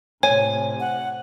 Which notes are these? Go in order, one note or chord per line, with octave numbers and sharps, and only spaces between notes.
A2 C3 C#5 G#5
F#5